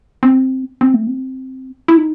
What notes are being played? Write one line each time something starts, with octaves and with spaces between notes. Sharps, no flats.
C4
C4
A3
C4
E4
D#4